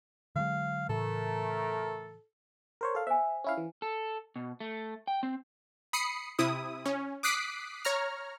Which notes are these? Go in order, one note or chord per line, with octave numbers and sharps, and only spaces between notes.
D3 F#3 G#3 F5
A2 C#3 E3 A3 A4 A#4
A#4 C5 C#5
A4 F5
C5 E5 G#5
C#4 E4 F5
E3
A4
B2
A3
G5
C4
B5 D#6 C7 C#7
C3 E4 D#6
C#4
D6 D#6 F#6 B6 C7 D7
C#5 A#5 F6